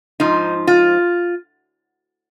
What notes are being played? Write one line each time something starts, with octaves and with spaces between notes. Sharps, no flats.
G#2 F3 D#4
F4